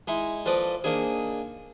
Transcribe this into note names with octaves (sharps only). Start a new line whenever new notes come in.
G#3 D#4 E4
F3 A4 B4 D5 D#5
A#3 D4 D#4 G#4